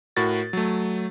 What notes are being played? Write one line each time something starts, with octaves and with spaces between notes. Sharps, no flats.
A2 F#4 A#4 A6
F#3 A3